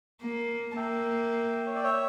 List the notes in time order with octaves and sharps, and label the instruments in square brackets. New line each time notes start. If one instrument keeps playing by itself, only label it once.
[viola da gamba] A#3
[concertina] A5
[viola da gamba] A#3 [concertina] E5 G5
[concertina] C#5
D5
C#5 E5